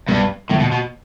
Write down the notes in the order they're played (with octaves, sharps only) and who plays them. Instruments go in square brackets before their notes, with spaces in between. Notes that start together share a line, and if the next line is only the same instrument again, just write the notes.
[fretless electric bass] C2 B2 B3 [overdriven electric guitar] G2
[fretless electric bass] E2 D3 G3 B3 [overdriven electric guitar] A2
[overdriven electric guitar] B2
B2